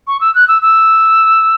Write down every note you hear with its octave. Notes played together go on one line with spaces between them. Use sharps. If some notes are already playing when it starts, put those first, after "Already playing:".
C#6
E6
F#6
E6
E6